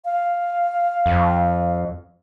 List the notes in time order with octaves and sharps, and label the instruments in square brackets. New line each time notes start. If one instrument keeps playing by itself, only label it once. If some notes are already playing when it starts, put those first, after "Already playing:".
[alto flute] F5
[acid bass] F2